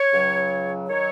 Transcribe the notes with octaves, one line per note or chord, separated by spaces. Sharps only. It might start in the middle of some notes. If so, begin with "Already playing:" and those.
Already playing: C#5
C#2 C#3 F#3
D#3 F#3 C#5